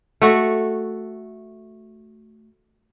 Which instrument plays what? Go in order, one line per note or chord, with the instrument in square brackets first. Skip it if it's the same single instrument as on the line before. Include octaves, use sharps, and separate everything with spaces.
[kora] A3 F#4